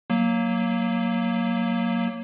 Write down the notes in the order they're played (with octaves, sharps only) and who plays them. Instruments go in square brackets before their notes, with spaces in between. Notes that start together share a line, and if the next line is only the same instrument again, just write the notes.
[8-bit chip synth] F#3 A#3